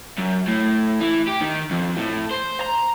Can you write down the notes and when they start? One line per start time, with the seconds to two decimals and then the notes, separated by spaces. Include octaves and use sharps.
0.18 F#2
0.47 A2
1.00 E3
1.27 G4
1.41 D#3
1.71 F2
1.97 A2
2.31 C5
2.60 A#5